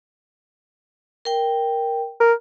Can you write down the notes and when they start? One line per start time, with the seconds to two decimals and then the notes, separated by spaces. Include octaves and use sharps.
1.25 A#4 G5
2.20 A#4